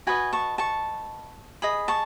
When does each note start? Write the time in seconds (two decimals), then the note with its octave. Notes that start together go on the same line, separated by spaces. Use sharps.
0.07 F#4 B4 D#5 G#5 B5
0.33 A5 C#6
0.58 A5 C#6
1.62 G#4 D#5 B5 D#6
1.88 A5 C#6